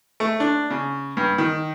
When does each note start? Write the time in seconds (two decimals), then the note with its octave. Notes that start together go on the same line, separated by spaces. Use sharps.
0.20 A3
0.40 D4
0.70 C#3
1.17 G2
1.38 D#3